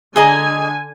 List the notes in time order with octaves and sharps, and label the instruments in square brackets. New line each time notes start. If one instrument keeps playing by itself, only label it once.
[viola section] D3 G#5 [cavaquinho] G#4 D#5 A#5